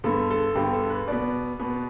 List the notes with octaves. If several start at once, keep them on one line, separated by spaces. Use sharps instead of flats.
G2 D3 B3 A4
A4
G2 D3 B3 G4
A4
B4
B2 B3 D5
B2 B3